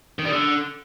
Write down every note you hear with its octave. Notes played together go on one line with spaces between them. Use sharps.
D#3
G3
D3